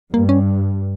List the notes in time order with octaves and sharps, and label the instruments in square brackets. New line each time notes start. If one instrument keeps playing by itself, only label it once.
[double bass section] G2 [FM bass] A#3
[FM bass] C#4